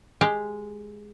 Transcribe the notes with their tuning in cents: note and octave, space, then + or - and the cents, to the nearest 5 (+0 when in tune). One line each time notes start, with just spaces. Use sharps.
G#3 +0 G4 +0